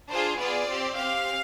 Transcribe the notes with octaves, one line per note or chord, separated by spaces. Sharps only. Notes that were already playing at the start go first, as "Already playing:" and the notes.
D4 F4 G#4 C5
B3 F4 G#4 D5
C4 G4
C4 G4 F5